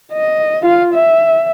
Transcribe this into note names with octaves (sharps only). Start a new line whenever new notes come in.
D#5
F4 F5
E5